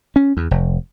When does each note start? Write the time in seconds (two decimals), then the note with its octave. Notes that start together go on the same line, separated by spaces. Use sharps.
0.16 C#4
0.37 E2
0.51 F1